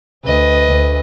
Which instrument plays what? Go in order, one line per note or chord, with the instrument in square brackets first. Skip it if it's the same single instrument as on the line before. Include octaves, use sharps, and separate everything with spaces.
[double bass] D2 [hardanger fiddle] B4 D#5
[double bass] D2